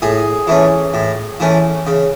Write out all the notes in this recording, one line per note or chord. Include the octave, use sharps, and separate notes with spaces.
A2 G#4
E3 A3 C#4
A2
E3 A3 C#4
C#3